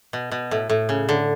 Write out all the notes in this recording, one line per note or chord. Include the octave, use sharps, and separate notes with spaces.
B2
B2
A2
A2
C#3
D3